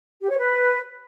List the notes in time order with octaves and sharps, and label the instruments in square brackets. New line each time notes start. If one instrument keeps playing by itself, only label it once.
[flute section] G4
C#5
B4